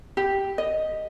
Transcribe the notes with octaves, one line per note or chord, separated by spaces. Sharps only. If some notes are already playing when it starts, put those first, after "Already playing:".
G4
D#5